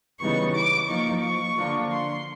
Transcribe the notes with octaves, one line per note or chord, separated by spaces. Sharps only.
C#3 E3 G3 B3 D#4 C#6
D6
F3 A#3 D#4 C#6
C#6
D3 F3 A#3 D4 F4
C6